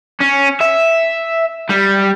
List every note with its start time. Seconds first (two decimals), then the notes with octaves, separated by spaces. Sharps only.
0.20 C#4
0.60 E5
1.69 G3